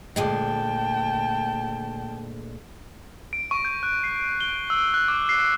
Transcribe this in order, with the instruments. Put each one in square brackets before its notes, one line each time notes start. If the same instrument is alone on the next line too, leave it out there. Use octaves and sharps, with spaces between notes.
[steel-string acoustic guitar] D2 A#2 G#3 [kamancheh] G5 A5
[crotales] D7
C#6
G6
F#6
C7
G7
E6
F#6
D6
C7